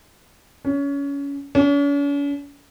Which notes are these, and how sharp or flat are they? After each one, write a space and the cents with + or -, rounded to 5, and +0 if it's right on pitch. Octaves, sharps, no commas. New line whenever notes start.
C#4 +25
C#4 +45